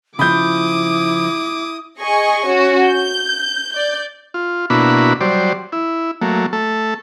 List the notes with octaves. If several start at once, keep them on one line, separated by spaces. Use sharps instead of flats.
C#3 F3 E4 B5 D6 D#6 G6
G#4 D#5 G#5 C#6
C#4 F#4
G6
D5 G6
F4
B2 A#3 D4 E4 F#4 B5
F#3 G3 C5 D5
E4
F#3 A3 A#3
A3 A4